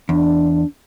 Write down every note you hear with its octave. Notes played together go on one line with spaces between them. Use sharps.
E2 D4